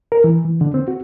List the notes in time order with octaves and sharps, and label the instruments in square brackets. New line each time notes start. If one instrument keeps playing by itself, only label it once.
[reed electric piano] A#4
E3
E3
D3
C4
F#4